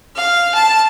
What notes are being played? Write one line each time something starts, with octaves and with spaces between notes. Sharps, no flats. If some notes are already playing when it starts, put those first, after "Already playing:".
F5
A5